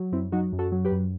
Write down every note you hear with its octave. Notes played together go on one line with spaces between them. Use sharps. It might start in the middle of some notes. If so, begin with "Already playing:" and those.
Already playing: F#3
F#2 C4 E4
F#3 D#4 F#4
F#2
F#4 A4
F#3
G4 B4
F#2